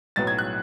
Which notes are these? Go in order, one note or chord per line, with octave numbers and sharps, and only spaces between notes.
B1 A2 F#3 B3 A6
G#6
F#6